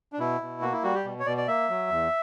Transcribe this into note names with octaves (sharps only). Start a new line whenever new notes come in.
D4
B2 E4
B2
A#3 F#4
E4
G3 F#4
G4
B2
C#5
B2 D5
D5
A#3 E5
F#3
E2